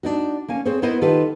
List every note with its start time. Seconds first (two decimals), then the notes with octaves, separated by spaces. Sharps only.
0.03 D4 D#4 F#4
0.48 A#3 C#4 G#5
0.65 C4 G#4 C5 C#5
0.82 B3 E4 A#4 C5 D#5
1.01 D#3 F4 G4 A4 B4 F#5